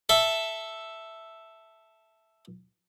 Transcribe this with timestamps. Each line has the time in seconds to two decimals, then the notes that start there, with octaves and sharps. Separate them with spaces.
0.09 A4 E5